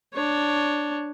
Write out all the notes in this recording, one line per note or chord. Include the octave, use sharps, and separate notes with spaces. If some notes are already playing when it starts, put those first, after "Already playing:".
D4 C#5